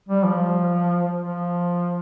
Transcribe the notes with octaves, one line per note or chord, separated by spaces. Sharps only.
G3
F3
F3